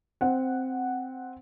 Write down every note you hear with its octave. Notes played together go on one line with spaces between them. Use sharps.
C4 F#5